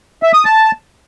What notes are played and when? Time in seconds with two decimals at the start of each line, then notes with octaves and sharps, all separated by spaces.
0.23 E5
0.34 D#6
0.45 A5